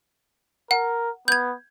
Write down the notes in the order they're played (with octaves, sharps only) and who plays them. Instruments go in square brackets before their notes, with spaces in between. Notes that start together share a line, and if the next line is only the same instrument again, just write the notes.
[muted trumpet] A#4 [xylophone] F#5
[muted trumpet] B3 [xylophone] G6 G#6